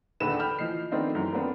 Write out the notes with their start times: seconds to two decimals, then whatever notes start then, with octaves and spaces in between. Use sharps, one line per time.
0.20 A#1 D#2 D3 B4 E7
0.39 G5 B5 F6 G6
0.59 E3 F3 D#5 C7
0.92 D#3 A3 B3 C4 D4 D#4
1.15 F#2 E3
1.33 B3 C4 D4 A4 A#4